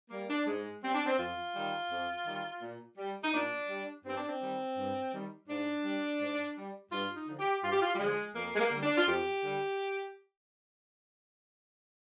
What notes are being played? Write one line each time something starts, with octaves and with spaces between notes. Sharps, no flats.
G3 A#3
D4
G#2 G#3
G3 C4
D4
C4
F2 F4
D#3 G3
F2
D#3 G3
A#2
G3
D#4
A#2 D4
G3
G2 C4
D4
C4
D#3 G3
G2
D#3 G3
G#2 D4
G3
G#2
G3
G2 F4
D#4
D3 F3
G4
G2 F4
G4
F4
G3
D3 F3 G#3
F2 A#3
G#3
A#3
D3 G3
D4
F4
F2 G4
D3 G3